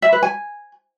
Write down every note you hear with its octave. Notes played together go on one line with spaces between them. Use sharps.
E5
B4
G#5